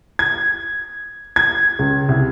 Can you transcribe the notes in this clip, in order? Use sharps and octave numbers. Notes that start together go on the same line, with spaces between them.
G#6
G#6
C#2
C2